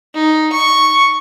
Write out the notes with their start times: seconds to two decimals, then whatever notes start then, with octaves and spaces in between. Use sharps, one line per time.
0.15 D#4
0.53 C#6